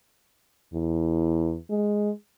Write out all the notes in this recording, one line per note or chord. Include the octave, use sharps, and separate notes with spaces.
E2
G#3